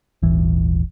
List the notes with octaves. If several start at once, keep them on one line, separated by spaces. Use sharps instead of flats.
D#1 G#1 E3